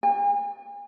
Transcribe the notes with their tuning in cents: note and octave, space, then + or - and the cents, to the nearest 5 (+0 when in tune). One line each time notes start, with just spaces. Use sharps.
G#5 -45